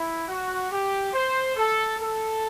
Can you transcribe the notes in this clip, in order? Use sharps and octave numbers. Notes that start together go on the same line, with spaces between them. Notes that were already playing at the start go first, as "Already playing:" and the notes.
Already playing: E4
F#4
G4
C5
A4
A4